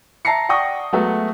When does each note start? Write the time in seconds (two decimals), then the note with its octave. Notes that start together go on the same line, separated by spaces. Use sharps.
0.25 E5 A5 A#5 A#6 C7 C#7
0.49 D5 F#5 G5 C#6 D#6 A#6
0.93 F#3 G#3 A3 B3 F#4 E5